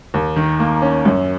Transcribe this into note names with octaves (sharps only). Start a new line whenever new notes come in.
D#2
D#3
A#3
C#4
F#2